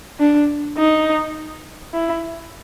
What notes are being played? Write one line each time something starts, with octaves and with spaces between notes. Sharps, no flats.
D4
D#4
E4